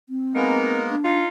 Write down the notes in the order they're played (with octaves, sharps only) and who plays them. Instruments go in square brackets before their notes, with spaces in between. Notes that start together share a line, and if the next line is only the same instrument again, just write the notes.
[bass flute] C4
[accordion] G#3 A#3 B3 [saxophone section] D#4 A#4
[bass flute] D4
[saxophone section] D#4 F4